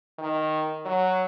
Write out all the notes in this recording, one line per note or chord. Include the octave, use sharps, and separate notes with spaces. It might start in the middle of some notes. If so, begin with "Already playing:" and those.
D#3
F#3